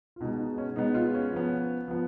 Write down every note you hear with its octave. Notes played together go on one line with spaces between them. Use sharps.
F4
B2 G#3 B3 D#4
D#4
C#4
B2 G#3 B3 D#4
F4
C#4
F3 B3
F3 B3